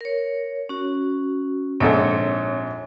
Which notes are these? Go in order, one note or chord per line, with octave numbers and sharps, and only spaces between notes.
A#4 C#5
C#4 F#4
A#1 G#2 C4 A4 C#5